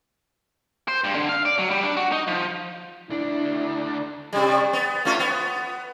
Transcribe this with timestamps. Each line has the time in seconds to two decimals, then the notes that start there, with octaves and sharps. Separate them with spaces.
0.88 C5
1.04 G2
1.15 D3
1.29 F5
1.45 D5
1.58 F#3
1.70 G3
1.84 D4
1.97 F#4
2.12 D#4
2.28 F3
3.10 D2 D4 E4
4.33 C3 G3
4.73 B3
5.05 A3 C#4 F4
5.19 B3